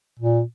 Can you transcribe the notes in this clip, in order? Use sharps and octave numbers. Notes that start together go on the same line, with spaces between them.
A#2